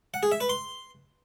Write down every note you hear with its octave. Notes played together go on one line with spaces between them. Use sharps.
F#5
G#4
E5
B4
C6